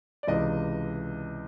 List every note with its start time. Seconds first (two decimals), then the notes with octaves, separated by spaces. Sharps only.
0.23 D5
0.28 C#2 C3 E3 D#5